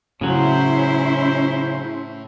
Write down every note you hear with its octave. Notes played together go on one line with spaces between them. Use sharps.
A2 C#3 F#3 C#4 E4 C5